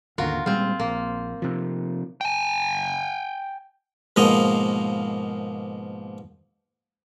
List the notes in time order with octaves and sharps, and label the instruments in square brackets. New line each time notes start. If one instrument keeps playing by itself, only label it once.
[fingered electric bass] G#1 D#2 D3 [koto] F4 F#4 A#4
[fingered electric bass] A#2 G3 G#3 [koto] C4 F4
[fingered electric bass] A#1 [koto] A#3
[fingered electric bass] C3 F3
[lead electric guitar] G5 G#5
[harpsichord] G#2 B2 F3 A#3 D#5